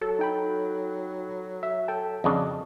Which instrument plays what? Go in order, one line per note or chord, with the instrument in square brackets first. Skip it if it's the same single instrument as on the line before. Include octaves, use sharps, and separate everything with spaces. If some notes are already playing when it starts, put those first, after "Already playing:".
[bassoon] F#3 [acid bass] A4
[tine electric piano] D#4 G5 B5
E5
A4 G5 A5
[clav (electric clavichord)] F2 C#3 D4 [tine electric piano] D#5